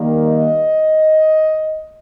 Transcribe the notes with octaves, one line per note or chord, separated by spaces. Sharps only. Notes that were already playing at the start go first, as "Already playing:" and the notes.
Already playing: D#3 G3 A#3
D#5